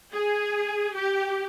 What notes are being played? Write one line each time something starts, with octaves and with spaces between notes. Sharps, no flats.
G#4
G4